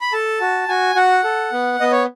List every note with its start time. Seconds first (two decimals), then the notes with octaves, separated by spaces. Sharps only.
0.01 B5
0.12 A4 A5
0.41 F#4
0.68 F#4 G#5
0.95 F#4 F#5
1.24 A4
1.52 B3
1.80 B3 D#5
1.92 C#5